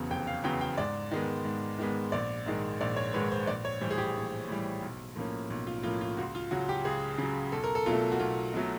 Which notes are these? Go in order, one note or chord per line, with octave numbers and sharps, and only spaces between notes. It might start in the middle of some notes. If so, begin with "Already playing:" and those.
Already playing: F1 E2 C#3 F#3 B3
F1 G5
F5
E2 C#3 F#3 B3 G5
G5
G#2 D5
D#3 G#3 B3
G#2
D#3 G#3 B3
A#1 D5
G#2 D#3 G#3
A#1 D5
C#5
G#2 D#3 G#3 B4
C5
A#1 D5
C#5
A2 E3 G3 C5
G#4
G4
A#1
A2 E3 G3
B1
A2 F3 A#3 C#4
B1
F4
A2 F3 A#3 C#4 F4
F4
C#2 F#4
F4
C#3 F#3 F#4
G4
C#2 G#4
C#3 F#3
B1 A4
A#4
A4
B2 F#3 A3 F4
F#4
B1 F4
B2 F#3 A3